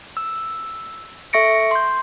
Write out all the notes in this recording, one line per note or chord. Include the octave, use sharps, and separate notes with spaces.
E6
A4 E5 C#6 A#6 C#7 D7
C6 G6